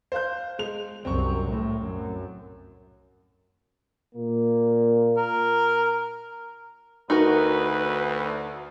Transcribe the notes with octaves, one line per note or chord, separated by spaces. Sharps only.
C5 F5 G6
G#3 F7
C2 F#2 C4 C#6
A2
F#2
A#2 A#3
A#4
D2 D#4 F#4 A#4 B4